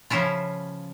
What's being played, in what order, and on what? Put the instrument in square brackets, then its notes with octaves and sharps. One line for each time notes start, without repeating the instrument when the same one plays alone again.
[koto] C#3 F3 C#4 E4 F4